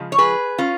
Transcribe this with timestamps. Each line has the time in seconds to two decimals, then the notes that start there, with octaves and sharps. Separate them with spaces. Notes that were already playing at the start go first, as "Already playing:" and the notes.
Already playing: C#3 F3 G#3
0.12 C#5
0.18 G#4 B4
0.58 C#4 F4